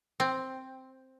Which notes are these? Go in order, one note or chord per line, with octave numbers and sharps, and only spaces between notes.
C4